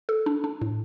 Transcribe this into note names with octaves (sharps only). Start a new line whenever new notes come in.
A4
D4
D4
A2